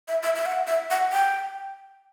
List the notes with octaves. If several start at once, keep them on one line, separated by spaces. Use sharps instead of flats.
E5
E5
E5
F#5
E5
F#5
G5